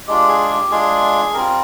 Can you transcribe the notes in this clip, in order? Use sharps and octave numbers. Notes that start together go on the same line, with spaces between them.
G#3 D4 F4 G4
G#4
G4
G#3 D4 F4 G#4
G3 C4 F4 A#4